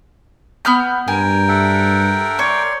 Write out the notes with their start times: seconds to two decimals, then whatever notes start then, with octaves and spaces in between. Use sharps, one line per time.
0.65 B3 F6 G6
1.08 G2 A#4 G5 G#5
1.49 A4 E5 F#5
2.39 C#5 D5 C6